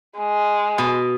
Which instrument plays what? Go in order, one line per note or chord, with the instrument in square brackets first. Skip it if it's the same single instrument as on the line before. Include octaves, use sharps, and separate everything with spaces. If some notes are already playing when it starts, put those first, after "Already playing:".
[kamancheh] G#3
[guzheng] B2